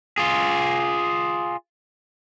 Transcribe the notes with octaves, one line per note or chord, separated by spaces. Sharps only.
F4 G#4